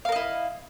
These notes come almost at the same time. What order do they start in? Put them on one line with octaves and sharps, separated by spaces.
F5 A#4 D#5 E4